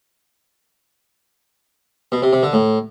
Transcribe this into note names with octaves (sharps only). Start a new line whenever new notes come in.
B2
C3
C3
D3
A2